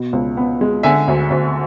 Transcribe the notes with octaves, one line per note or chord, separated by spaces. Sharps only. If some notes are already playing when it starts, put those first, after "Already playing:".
Already playing: B2
C#2
B3
G#3
D3 E5 G#5
D2
D2